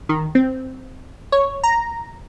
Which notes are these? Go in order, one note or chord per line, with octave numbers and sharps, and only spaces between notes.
D#3
C4
C#5
A#5